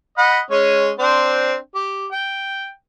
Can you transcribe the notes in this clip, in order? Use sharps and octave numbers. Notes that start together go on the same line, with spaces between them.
D#5 F#5 B5
G#3 C#4 C#5
C4 D4 C5
G4
G5